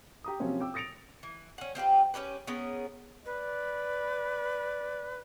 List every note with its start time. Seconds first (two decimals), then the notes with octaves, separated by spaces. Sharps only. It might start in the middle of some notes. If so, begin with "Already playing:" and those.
0.24 G4 A#5 D#6
0.40 C3 F3 F#3 A#3 C4 C#4
0.61 G5 D6 E6
0.74 D#6 A6 A#6 C#7 D7 F7
1.23 E3
1.58 C#4 F#5
1.75 C4 F4 G4 B4
2.14 C#4 E4 G4 B4
2.47 B3 C#4 G#4 A#4
3.26 B4 D5